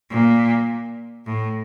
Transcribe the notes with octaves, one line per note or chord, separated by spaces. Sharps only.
A#2
A2